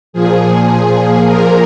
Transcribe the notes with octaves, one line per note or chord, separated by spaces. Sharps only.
A#2 F3 G#4
A#2 F3 A#4